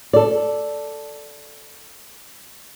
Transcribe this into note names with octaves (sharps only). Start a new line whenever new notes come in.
A4 D5